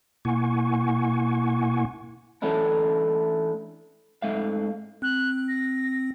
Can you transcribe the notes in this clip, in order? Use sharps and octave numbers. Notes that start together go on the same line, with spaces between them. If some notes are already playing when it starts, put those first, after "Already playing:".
B2 A#3 E4 F#5 G#5 C#6
E3 A3 C#4 D4 E4
G#2 A3 E5 F5
C4 F#6
A#6